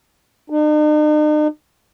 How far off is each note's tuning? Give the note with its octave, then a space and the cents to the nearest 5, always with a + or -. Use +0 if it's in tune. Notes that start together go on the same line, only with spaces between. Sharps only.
D#4 -45